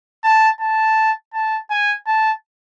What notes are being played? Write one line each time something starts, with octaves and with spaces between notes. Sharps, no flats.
A5
A5
A5
G#5
A5